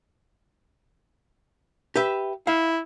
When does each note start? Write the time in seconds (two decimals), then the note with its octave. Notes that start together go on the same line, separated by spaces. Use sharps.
1.96 G4 B4 E5
2.47 E4 F5